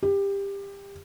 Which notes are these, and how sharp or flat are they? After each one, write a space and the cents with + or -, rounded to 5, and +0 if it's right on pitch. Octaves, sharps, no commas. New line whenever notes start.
G4 +20